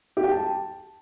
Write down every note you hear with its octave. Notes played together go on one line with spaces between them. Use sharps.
G4
G5
A5